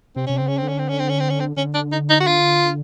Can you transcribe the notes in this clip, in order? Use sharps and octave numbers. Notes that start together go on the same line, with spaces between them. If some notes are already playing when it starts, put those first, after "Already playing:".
C3 C4
C3 C#4
C#3 C4
C#4
C4
D3
C#4
C4
C#4
C4
C#4
C4
C#4
C4
D3 C#4
D4
D#4
D#4
F#4
F4